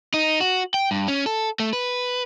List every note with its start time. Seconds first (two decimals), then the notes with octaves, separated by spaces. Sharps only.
0.14 D#4
0.40 F#4
0.74 G5
0.91 G2
1.08 C#4
1.26 A4
1.60 A3
1.73 B4